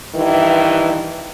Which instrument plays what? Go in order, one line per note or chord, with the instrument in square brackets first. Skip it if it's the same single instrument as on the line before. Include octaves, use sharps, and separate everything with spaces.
[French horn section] G2 D#3 E3